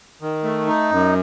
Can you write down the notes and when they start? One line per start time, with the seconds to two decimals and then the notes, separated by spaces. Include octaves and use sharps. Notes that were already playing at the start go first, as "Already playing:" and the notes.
0.22 D#3
0.44 A3
0.67 D#4
0.91 F#2